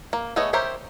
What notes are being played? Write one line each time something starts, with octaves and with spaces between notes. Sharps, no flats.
A#3
A3 B3 G#4 C#5 D#5
G4 A#4 C5 C#5 E5